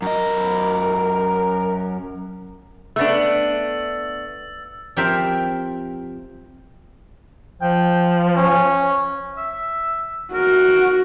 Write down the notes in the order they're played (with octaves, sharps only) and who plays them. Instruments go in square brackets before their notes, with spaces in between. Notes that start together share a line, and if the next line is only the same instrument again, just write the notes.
[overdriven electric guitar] F#2 D#5 [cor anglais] A#4
[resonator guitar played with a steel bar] A3 B3 D4 [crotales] E6 A6
[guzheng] F3 C4 G4 A#4 C5 E5
[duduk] F3 [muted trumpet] G5
[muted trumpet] C#4
[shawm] E5
[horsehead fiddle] F#4 [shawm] A#4